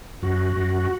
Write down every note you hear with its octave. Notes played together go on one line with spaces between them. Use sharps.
F#2 F#4
F#2